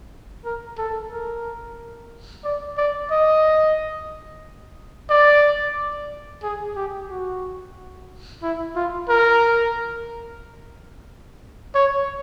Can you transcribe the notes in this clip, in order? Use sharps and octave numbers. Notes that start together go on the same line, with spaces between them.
A#4
A4
A#4
D5
D5
D#5
D5
G#4
G4
F#4
E4
F4
A#4
C#5